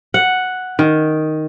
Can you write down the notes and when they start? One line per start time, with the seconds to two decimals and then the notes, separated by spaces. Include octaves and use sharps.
0.14 F#5
0.79 D#3